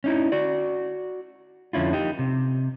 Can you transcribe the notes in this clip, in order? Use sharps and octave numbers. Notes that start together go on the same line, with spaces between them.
C#4 D#4 E4
F#4 D5
F2 D3 C#4 E4 F4
D#4 G4
C3